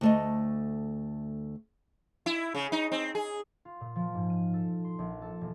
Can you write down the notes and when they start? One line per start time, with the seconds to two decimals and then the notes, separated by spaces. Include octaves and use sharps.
0.01 D2 A3 D#5
2.26 E4
2.55 C#3
2.72 D#4
2.92 C4
3.15 G#4
3.65 F4
3.81 A#2
3.96 F3
4.15 G#2
4.30 D#7
4.54 A4
4.84 C6
4.99 A#1
5.22 A4
5.41 E1